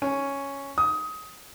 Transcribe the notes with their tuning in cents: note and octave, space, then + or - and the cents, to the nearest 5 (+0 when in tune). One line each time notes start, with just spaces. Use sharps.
C#4 +0
D#6 +20